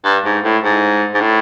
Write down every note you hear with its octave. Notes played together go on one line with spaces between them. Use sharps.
G2
G#2
A2
G#2
G#2
A2